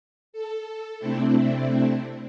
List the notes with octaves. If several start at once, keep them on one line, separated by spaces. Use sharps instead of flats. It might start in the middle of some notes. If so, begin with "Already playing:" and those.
A4
C3 A3 C4 D4 E4